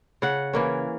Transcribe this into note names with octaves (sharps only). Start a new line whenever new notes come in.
C#3 F#5
E3 A#3 C#4